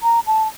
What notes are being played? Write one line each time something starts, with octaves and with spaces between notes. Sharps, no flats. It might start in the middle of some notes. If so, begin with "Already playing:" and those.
A#5
A5